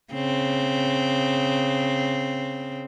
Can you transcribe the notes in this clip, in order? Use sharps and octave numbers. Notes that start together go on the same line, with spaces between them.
C#3 C4